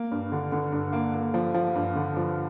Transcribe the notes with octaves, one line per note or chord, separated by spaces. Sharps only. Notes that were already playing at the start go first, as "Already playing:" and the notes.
Already playing: A#3
G2
D3
D3
G2
A#3
A#3
F3
F3
G2
D3
F3